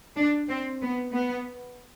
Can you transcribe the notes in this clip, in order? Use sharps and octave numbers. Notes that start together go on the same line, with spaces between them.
D4
C4
B3
B3